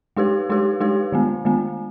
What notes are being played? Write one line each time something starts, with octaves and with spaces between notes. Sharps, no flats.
G#3 D#4 G4 B4
G#3 D#4 G4 B4
G#3 D#4 G4 B4
D#3 G#3 B3
D#3 G#3 B3